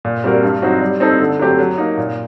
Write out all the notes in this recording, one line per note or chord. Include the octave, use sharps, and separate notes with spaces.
A#2
G3 C4 F#4 A#4
G2
F#3 C4 D#4 F#4
G3
C4 D#4 A4 C5
D3
F#3 A3 C4 G4
F#3
A#3 D#4
A#2